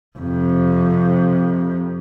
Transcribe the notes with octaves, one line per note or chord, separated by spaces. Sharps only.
F2 C3